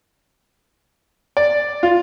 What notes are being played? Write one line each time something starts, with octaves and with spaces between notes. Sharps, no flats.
D5
F4